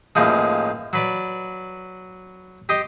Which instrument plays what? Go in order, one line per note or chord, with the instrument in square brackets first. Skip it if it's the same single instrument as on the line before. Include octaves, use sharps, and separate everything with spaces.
[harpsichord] A1 D#2 F3 G#3
F#3 B4 D5
G4 D#5 C6